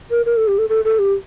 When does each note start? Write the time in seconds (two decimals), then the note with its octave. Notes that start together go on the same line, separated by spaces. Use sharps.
0.11 A#4
0.26 A#4
0.37 A4
0.48 G4
0.58 A4
0.69 A4
0.85 A4
0.99 G4